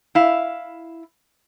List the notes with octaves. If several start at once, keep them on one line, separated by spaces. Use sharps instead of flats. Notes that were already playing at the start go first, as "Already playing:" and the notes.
E4 F5